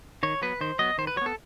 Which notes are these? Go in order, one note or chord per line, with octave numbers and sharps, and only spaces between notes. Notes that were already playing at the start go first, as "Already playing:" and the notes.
D#3 C#5
F#3 B3 B4
D#3 C5
F#3 B3 D#5
D#3 C5
B4
F#3 C#5
B3 A4